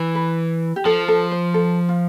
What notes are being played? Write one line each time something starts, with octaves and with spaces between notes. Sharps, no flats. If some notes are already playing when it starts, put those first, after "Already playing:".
Already playing: E3
B4
G4
F3 A4
A4
C5
A4
F4